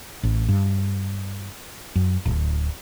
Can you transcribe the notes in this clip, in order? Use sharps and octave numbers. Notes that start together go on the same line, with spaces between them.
A1
G2
F#2
D1